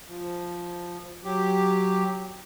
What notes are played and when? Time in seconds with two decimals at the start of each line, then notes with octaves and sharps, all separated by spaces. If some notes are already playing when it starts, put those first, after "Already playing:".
0.08 F3
1.24 F#3 G4